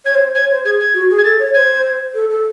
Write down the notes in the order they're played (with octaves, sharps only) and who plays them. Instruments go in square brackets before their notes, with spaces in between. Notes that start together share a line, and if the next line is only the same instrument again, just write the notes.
[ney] C#5 [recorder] G#6
[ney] C5
[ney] C#5 [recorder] G#6
[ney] C5
[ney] G#4 [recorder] G#6
[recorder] G#6
[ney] F#4
G#4
[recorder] G#6
[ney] A4 [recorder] A6
[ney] C#5
[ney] C5 [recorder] G#6
[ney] A4
A4